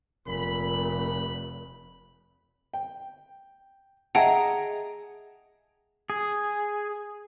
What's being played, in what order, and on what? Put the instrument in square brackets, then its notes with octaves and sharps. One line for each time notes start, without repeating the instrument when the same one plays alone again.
[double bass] F1 [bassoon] A#2 [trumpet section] B5
[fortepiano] G5
[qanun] G#4 A#5 [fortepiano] D#5 E5 A5 [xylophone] F#5 G5
[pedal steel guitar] G#4